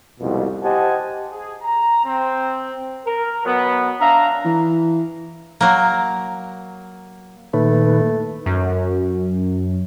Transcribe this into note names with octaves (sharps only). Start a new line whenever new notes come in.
C2 F2 G#2 B2
G4 C5 D#5 F#5 G#5 A5
G#4
A#5
C4
A#4
B2 F#3 B3
D4 E5 F5 A#5
E3
F#3 A#3
A#2 D#3 A3 B4
F#2